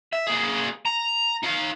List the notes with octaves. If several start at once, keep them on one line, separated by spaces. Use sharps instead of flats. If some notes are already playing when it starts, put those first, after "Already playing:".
E5
A#3 G#4
A#5
D#4 F5